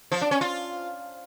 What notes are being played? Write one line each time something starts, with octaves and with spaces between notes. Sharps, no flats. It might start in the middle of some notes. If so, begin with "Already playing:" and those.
F3
D4
C#4
F4